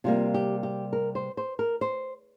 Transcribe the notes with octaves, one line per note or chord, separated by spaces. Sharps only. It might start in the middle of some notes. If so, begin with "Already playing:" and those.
C3 G3 A#3 F4
G4
G4
A#4
C5
C5
A#4
C5